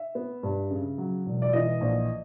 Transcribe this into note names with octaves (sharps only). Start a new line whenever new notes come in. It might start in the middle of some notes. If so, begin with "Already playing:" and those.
Already playing: E5
B3
G2
C#3
F#3
E1
D5
E3 D#5
A#1